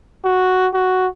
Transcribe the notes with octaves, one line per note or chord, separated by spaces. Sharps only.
F#4
F#4